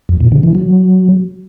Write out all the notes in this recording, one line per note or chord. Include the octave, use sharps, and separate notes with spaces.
F2
A#2
D3
E3
F#3